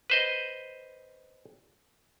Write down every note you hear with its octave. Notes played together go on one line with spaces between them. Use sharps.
B4 C5 D#5